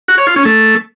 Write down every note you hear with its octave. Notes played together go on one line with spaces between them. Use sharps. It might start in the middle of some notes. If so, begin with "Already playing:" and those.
F#4
C#5
F4
C#4
A3